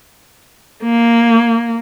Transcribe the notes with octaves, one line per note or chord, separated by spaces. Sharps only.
A#3